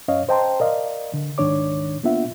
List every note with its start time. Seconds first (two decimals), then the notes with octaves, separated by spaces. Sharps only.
0.08 F#2 C#4 C#5 D#5 F5
0.29 C5 D#5 G5 A5 A#5 C6
0.60 A#4 D5 D#5 F5
1.14 D3
1.38 C#2 G#2 D#3 D4 C#5 D6
2.03 A#3 B3 D4 F4 E5 F#5